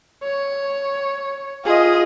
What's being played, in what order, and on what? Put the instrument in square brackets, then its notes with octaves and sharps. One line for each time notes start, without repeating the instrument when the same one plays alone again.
[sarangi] C#5
[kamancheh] F4 D#5 [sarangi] G#4